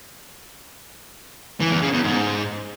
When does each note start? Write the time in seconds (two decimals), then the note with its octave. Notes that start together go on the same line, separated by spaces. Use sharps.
1.60 E3
1.71 E2
1.82 C#3
1.93 E2
2.03 G#2